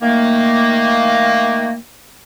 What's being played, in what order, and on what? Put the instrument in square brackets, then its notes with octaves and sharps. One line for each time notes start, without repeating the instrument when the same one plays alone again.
[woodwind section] D#3 A3 A#3